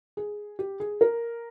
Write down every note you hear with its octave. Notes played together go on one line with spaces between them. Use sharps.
G#4
G4
G#4
A#4